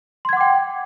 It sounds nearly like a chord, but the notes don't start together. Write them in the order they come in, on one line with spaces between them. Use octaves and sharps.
C6 G#6 F#5 D6 G5